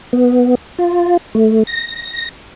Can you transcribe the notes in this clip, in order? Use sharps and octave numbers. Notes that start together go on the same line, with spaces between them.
B3
F4
A3
A#6